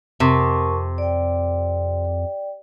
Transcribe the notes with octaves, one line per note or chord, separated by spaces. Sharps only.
F2 C3 A#4 A5 C#6
D5 G5